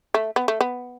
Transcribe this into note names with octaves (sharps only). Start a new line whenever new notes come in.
A3
B3
A3
B3